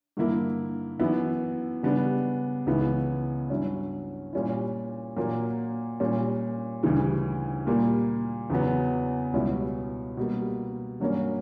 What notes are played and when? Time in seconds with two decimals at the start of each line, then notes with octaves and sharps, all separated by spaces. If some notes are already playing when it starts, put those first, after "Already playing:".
0.17 G2 D3 A#3 E4
1.00 F#2 E3 B3 E4
1.83 C#3 G3 B3 D4
2.66 C#2 C#3 E3 B3 E4
3.50 G2 F#3 C#4 E4
4.33 A#2 G3 C#4 E4
5.17 A#2 F#3 A#3
6.00 A#2 G3 C#4
6.83 D2 C#3 E3 G3
7.67 A#2 G3 A#3
8.50 E2 C#3 F#3 B3
9.33 C#2 B2 G3 C#4 E4
10.17 B2 G3 A#3
11.00 G2 F#3 A#3 C#4